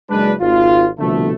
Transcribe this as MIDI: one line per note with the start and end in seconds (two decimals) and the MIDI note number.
0.10 0.33 30
0.10 0.33 56
0.10 0.33 62
0.10 0.33 71
0.41 0.88 32
0.41 0.88 65
0.99 1.32 36
0.99 1.32 47
0.99 1.32 50
0.99 1.32 53
0.99 1.32 57